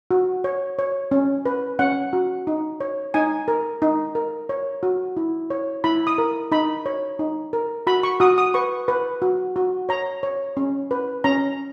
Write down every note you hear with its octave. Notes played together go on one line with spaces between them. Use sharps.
F#4
C#5
C#5
C#4
B4
C#4 F#5
F#4
D#4
C#5
D#4 G#5
A#4
D#4
A#4
C#5
F#4
E4
C#5
E4 B5
D#6
A#4
D#4 B5
C#5
D#4
A#4
F#4 B5
C#6
F#4 D#6
D#6
B4 C#6
B4
F#4
F#4
C#5 A#5
C#5
C#4
B4
C#4 A#5